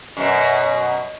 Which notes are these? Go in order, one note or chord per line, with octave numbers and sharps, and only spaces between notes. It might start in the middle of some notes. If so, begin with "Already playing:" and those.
F#2 B2